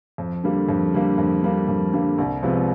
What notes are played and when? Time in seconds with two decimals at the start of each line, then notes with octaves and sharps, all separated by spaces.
0.18 F2
0.43 D3 G3 A#3
0.69 F2
0.94 D3 G3 A#3
1.18 F2
1.43 D3 G3 A#3
1.68 F2
1.93 D3 G3 A#3
2.18 C2
2.43 C3 F3 G#3 B3